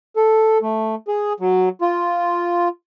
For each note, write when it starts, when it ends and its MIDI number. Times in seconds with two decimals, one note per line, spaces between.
0.16 0.58 69
0.62 0.95 57
1.08 1.33 68
1.40 1.69 54
1.81 2.68 65